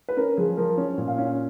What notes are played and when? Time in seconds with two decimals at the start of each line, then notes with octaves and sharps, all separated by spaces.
0.09 B4
0.17 C#4 A#4
0.37 F3 G#4
0.57 F3 A#4
0.77 C#4 C#5
0.98 A#2
1.08 F5
1.18 C#4